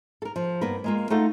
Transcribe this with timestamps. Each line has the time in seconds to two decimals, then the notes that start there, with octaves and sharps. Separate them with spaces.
0.22 A4 A#4
0.36 F3
0.61 G2 A#3 B3 A#4 B4
0.84 G#3 A#3 F4
1.10 A3 D#4 F4 A4 F5 F#5